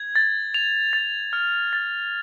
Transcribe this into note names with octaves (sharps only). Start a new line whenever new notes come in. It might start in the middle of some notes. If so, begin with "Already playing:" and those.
Already playing: G#6
A6
F7
A6
F6
A6